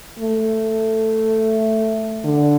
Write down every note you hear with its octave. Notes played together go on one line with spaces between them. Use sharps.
A3
D3